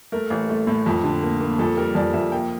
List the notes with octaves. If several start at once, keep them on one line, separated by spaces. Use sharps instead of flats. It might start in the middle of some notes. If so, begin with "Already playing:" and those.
A3 A#4
A1
A3
A2
F2
D3
A#3
A#3
F2 A4
G3 A#4
F2 D5
F2 E5
A#3 G5